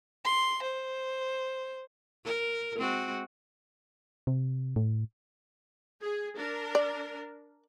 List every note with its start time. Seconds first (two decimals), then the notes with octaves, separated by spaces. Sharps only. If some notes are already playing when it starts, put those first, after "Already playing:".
0.25 C6
0.63 C5
2.25 A#4
2.77 G#3 C4 F#4
4.27 C3
4.76 A2
6.00 G#4
6.37 D4 A#4
6.75 D5